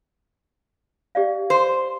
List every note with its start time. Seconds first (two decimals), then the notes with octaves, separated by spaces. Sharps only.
1.15 G4 D5 F5
1.50 C5